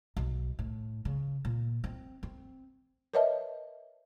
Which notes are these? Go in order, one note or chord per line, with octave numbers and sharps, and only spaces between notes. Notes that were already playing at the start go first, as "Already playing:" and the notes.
B1
A2
C#3
A#2
C4
C4
A#4 B4 C#5 D#5 E5 A5